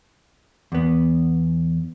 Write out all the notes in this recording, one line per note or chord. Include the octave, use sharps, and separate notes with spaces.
E2 B3